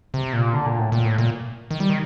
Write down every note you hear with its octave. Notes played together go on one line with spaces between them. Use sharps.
C3
A#2
D3
A#2
A2
A#2
A2
A#2
D#3
G3
D#3